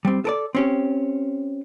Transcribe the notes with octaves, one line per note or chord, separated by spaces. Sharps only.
G3 C4
A4 A#4 D5
C4 C#4 G4